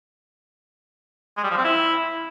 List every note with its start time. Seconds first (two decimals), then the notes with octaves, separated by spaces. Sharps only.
1.37 G#3
1.44 G3
1.51 F3
1.57 C4
1.64 E4